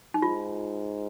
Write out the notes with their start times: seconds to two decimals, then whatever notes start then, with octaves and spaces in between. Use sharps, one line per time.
0.14 D#4
0.22 G#2 F4